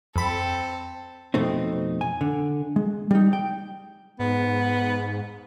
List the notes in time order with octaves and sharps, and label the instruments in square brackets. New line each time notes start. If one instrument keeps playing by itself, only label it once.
[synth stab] F2 B5 [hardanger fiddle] C4 A4
[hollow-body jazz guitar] F2 B2 A3 C4 D#4
G#5
D3
G#3
G3 D#4
G5
[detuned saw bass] G#2 [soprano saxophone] B3